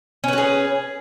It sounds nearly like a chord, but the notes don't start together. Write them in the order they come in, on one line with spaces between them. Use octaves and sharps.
C#4 B4 F#4 G#4